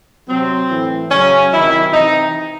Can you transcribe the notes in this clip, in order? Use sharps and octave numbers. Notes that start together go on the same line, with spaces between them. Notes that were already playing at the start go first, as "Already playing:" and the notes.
C3 F#3 C4
A2 E3
C#3 F#3 C#4
C3 D#3 F#3 E4
C3 E3 D#4